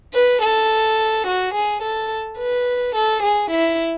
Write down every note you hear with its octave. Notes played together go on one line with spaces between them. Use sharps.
B4
A4
F#4
G#4
A4
B4
A4
G#4
E4